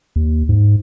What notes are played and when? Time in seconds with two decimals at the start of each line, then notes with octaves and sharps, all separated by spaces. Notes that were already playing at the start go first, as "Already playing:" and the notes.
0.16 D#2
0.49 G#2